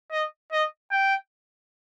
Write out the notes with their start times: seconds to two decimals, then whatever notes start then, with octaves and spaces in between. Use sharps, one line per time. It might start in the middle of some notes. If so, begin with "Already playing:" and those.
0.12 D#5
0.52 D#5
0.91 G5